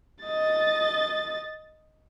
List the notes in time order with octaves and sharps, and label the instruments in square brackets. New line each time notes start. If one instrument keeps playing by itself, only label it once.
[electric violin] D#5 A6